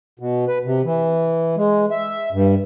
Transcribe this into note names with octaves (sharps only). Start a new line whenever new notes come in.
B2
B4
C3
E3
G#3
E5
G2